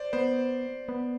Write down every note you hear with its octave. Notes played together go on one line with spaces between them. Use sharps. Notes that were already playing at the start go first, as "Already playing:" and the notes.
Already playing: C5 D5
B3 C5
B3